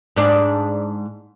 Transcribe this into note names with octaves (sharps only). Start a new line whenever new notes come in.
G#2 D4